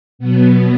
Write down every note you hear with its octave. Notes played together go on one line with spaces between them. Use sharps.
B2 F#3 B3